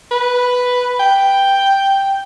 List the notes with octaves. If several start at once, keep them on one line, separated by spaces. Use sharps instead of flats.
B4
G5